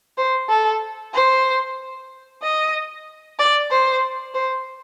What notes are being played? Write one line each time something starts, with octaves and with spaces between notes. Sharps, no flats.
C5
A4
C5
D#5
D5
C5
C5